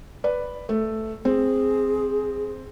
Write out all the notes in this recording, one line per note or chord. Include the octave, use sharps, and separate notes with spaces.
B4 D5
A3
C4 G#4